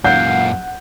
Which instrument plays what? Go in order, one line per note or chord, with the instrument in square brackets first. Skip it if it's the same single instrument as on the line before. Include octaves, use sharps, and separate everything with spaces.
[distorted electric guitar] F#2 A#2 [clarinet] F5 [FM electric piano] F#5 [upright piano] G6